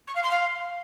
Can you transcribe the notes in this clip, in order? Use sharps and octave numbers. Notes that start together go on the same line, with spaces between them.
C#6
F5
C6
F5